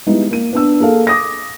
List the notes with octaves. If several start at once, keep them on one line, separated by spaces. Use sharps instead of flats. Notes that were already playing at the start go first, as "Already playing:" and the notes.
G3 G#3 B3 D#4 E4
A#3 D#7
B3 D4 E6
A#3 G#4 A4 F5
D6 D#6 A#6